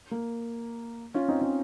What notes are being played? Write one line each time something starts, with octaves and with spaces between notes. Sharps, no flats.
A#3
C#4 F4
C4 D#4
C#4 F4